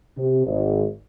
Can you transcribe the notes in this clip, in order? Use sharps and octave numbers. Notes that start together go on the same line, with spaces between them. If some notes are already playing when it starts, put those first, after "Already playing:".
C3
G#1